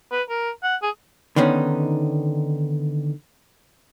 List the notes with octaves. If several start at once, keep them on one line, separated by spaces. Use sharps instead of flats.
B4
A#4
F#5
G#4
D3 D#3 B3 C#4 D#4